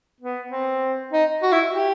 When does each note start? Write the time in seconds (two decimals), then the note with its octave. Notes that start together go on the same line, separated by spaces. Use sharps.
0.21 B3
0.51 C4
1.13 D#4
1.43 F#4
1.53 E4
1.73 G4